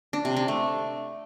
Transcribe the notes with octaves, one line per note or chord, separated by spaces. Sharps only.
D4
C3
D4
A3